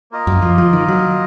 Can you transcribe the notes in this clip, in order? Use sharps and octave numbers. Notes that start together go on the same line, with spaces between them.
A#3 F4 A#4 D#5
F#2
F3
F3
D#3
F#3